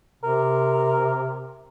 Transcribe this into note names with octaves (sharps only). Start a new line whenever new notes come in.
C3 A#4